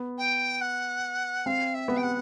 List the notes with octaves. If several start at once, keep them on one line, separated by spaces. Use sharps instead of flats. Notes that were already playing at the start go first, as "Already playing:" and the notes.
Already playing: B3
G5
F#5
C4 F5
E5
B3
G5
F#5